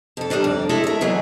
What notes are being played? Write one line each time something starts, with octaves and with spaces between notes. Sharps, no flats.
F2 A4
D#2 D#3 G3 D4
F2 D5
G#3 A3 E4 A4
A#4 E5
E2 E3 F#3 G#3